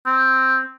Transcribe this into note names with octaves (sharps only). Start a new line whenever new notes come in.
C4